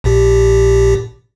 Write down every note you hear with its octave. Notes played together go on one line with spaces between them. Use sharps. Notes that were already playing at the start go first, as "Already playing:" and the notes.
A#1 A#2 G4